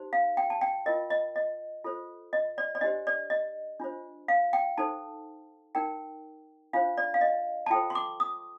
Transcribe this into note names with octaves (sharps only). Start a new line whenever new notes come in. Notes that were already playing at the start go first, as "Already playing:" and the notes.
Already playing: D#4 G4 C5
F5
G5
A5
G5
F4 A#4 D#5
D#5
D#5
F4 A4 C5
D#5
D5
D5
D4 G4 C5 D#5
D5
D#5
D4 F4 C5
F5
G5
D#4 A4 C5 A5
D#4 A#4 G5
D4 F4 C5 F5
D5
F5
D#5
A5
F4 A4 C5 G5
C6
D6
D#6